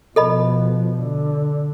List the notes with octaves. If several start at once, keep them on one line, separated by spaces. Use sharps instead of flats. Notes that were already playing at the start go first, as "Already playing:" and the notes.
B2 F3 A4 D#5 B5
D3